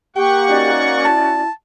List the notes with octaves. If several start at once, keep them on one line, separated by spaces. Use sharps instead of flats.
A#3 G4 F#5 G5 C#6
C#4 D#4 F#4 D5
E4 A5